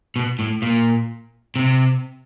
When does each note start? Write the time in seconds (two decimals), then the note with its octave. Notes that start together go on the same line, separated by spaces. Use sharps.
0.16 B2
0.39 A2
0.62 A#2
1.56 C3